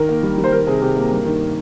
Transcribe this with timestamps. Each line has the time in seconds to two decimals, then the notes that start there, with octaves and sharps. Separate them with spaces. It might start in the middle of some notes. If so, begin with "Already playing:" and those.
Already playing: D#3 A#4
0.09 A#3
0.23 G3
0.38 G3
0.44 C5
0.52 D#3 A#4
0.66 C3 G#4
0.81 C3 G4
0.97 A#3
1.11 G2
1.25 D#3